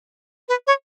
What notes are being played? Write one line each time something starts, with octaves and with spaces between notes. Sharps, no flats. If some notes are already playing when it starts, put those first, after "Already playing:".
B4
C#5